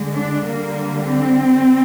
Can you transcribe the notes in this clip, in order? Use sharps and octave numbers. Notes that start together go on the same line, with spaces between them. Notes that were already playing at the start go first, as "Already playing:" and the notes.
Already playing: D3 G#3
D4
D3 G3 A#3
C4